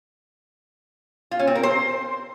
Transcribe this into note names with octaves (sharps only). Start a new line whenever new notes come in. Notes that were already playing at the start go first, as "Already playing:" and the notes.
F4
C#4
C4
A#4
C5